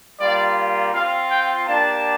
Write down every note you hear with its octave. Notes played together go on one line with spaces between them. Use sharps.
G3 A#3 F4 D5
C4 F4 F5
G5
A#3 D4 G4 A5